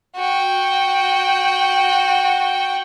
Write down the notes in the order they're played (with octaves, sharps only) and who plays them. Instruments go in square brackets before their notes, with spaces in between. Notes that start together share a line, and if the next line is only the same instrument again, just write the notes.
[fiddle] F#4 G5